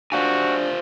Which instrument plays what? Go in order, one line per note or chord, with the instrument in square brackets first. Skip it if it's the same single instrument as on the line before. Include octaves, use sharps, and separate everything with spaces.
[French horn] D4 [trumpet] F#4 [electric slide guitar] C5 F5 G#5